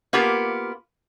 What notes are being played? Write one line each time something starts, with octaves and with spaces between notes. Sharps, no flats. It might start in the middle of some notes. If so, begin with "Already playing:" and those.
A#3 B3 F4 G4 A#4